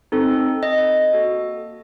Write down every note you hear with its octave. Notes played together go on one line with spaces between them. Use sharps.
C4 D#4 A4
D#5
A#3 F#4 A4